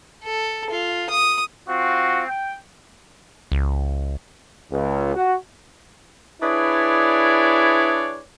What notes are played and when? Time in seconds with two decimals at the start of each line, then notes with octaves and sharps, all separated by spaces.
0.24 A4
0.70 F4
1.10 D#6
1.68 C4 F4 F#4
2.27 G5
3.52 C#2
4.71 C#2
5.15 F#4
6.42 D4 E4 G#4 B4 C#5 D5